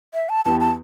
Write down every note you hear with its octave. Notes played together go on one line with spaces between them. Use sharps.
E5
A5
E2 E3 B3 G4 A5
A5